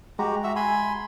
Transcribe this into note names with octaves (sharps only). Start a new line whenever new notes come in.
G#3 F#4 G4 A#5
F#4 E5
G#5 B5 C6